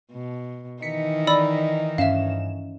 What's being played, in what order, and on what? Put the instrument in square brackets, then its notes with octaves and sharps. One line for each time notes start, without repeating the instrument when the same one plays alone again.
[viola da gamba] B2
[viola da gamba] D#3 E3 D#4 [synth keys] B6 C#7
[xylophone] D5 B5 E6
[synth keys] G2 C#4 E7 [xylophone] E5 F5